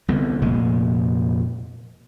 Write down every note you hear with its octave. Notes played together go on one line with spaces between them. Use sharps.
C2 D3 B3
F1 A#2 G#3